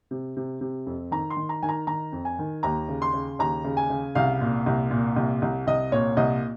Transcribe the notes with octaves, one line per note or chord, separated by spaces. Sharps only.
C3
C3
C3
F2
D#3 A#5
C6
D#3
A#5
D#3 G#5
A#5
D#3 A#5
F2
G#5
D#3
D#2 A#5
C#3
C6
C#3
D#2 A#5
C#3
G#5
C#3
C2 F5
A#2
C2
A#2
C2
C2
C2 D#5
A#2 C#5
C2 D#5